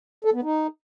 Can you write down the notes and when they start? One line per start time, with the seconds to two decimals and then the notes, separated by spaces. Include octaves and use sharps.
0.25 A4
0.34 B3
0.43 D#4